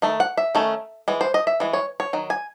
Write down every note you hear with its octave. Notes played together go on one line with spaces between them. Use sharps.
D#3 A3
F#5
E5
D#3 A3 C#4
E3 G#3
C5
D#5
E5
E3 G#3
C#5
C#5
D#3 F#3
G#5